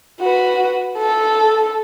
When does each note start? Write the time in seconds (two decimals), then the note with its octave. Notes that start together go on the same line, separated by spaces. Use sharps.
0.22 F#4 B4
0.98 A4